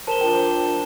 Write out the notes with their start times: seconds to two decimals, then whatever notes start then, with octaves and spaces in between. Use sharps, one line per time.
0.07 A#4 C5 A5 E7 G7
0.21 F3 D4 G5